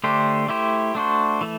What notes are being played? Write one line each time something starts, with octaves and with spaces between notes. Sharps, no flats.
D3 A3 D4 G4 C5
A3 E4 G4 C5
A3 D4 F#4 C5
E3 A3